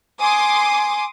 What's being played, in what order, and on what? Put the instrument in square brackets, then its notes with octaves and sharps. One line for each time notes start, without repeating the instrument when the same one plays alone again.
[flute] G#5 [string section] C6 D6 D#6